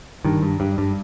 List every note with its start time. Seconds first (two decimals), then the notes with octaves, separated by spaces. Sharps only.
0.25 G2 D#3
0.43 G2
0.60 G2
0.78 G2